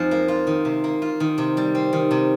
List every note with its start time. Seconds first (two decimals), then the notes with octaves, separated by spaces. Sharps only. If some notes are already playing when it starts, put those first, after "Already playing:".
Already playing: F2 F3 G#3 D#4
0.11 A#3
0.28 F4
0.47 D#3
0.65 C3
0.84 A#3
1.02 F4
1.20 D#3
1.38 C3
1.57 G3
1.75 C4
1.93 D#3
2.11 C3